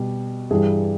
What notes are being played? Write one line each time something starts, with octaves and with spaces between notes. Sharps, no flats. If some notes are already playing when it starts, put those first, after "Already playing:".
Already playing: B2 G3
G2 E3 G3 G#4